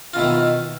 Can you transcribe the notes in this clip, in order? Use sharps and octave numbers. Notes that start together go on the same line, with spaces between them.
B2 D#3 E4 F4